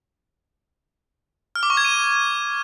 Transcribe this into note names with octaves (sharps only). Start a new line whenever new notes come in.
F6
D6
C#6
G#6
D#7